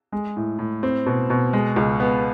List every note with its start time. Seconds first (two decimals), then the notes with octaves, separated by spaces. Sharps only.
0.12 G#3
0.37 A2
0.59 A2
0.83 C4
1.06 B2
1.30 B2
1.53 G#3
1.76 C#2
2.00 B3